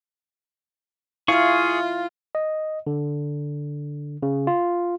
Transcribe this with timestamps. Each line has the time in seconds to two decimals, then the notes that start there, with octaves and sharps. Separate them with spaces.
1.28 E4 F4 G#4 F5 C#6
2.35 D#5
2.87 D3
4.23 C#3
4.47 F4